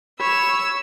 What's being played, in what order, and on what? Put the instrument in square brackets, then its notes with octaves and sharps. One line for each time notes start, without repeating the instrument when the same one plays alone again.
[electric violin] C#5 [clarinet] B5 [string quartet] E6